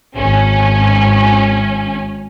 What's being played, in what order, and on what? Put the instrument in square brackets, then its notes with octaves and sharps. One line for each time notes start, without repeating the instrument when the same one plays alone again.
[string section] G#1 C#4